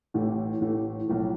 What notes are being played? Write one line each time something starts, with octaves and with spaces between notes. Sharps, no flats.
A1 A2 E3 A3
A1 A2 E3 A3
B1 A2 F3